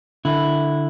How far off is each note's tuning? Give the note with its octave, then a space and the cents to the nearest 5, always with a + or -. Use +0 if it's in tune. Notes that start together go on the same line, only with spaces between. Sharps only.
D3 +0 E4 +0